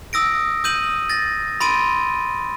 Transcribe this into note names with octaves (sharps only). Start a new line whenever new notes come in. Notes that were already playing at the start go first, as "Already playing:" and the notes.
D#6 E6 A#6 D7
D#6 G6 D#7 F#7
A6 A#6
B5 C6 A6 D7 D#7